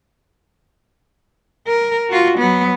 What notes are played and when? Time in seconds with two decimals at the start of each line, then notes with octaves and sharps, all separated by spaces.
1.67 A#4
2.09 F4 F#4
2.38 F#3 B3